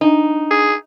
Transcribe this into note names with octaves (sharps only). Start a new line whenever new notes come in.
D4 D#4
G#4